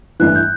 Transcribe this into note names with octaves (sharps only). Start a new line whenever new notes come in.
A1 G2 E3 F#6
G6